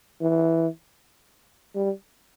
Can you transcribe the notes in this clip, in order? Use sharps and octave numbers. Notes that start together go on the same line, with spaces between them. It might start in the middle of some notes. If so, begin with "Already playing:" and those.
E3
G3